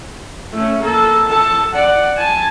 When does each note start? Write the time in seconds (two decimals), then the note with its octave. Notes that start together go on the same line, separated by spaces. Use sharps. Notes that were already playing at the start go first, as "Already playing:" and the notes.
0.53 A3 C#4
0.82 A#3 A4
1.28 A4 A5
1.73 D5 F#5
2.17 G#5 A5